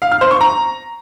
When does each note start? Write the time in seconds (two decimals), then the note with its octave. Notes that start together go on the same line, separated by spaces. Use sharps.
0.02 F5
0.11 F6
0.21 C5
0.31 C#6
0.41 A#5